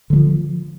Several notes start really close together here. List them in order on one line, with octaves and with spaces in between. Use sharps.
D3 G3 F3